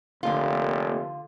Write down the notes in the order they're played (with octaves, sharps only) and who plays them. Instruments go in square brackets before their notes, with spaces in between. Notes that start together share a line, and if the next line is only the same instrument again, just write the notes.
[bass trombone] F1 [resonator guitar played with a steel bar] D3 F4 [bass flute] A#3